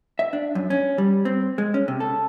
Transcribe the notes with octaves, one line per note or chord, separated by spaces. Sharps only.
E5
D4
F#2
C#4
G3
C4
G#3
C#4
C3
A4